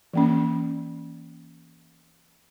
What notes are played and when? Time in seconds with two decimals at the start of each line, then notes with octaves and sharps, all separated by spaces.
0.14 E3 A#3 C#4